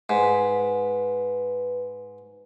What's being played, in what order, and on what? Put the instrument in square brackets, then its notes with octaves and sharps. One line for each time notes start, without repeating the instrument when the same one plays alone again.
[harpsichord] G#2 [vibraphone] B4